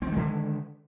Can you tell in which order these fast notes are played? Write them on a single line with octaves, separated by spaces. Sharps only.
C4 D#3 G#3 D3